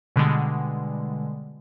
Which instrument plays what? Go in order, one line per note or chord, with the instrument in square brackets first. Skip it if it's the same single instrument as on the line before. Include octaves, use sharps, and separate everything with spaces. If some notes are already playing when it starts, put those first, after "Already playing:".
[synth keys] B2 D3 G3 G#3